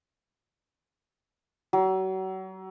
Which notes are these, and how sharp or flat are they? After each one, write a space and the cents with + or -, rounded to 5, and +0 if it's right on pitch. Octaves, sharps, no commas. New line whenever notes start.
F#3 +35